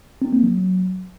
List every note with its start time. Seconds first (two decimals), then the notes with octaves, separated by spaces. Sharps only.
0.22 C4
0.33 A#3
0.43 F#3